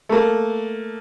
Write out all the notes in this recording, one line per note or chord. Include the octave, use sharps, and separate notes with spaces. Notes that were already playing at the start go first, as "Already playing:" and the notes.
A3 A#3